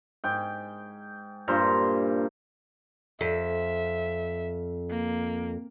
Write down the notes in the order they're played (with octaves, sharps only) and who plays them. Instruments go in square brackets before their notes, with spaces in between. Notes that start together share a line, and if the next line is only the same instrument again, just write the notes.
[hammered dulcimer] G#2 G5
G2 A#2 C5 A#5
[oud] F2 [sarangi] E5
[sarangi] A#3